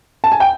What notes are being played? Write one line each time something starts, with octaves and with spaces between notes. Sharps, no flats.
A5
G#5
G5